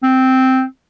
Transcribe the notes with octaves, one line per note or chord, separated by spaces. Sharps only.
C4